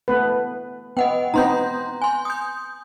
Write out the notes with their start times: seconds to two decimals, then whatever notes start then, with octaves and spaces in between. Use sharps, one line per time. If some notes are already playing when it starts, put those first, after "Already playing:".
0.08 A3 B3 B4
0.97 B3 D#5 F#5 G5
1.34 B3 C4 D#4 A#5 C6 G6
2.02 G#5 C6
2.25 D#6 G6